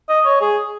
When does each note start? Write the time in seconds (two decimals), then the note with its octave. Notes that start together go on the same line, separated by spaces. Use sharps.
0.09 D#5
0.25 C#5
0.41 G#4